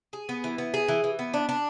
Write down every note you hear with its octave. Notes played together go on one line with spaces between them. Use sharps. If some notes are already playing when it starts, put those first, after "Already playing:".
G#4
B3
E3
B3
G#4
E3
E3
B3
D4
D4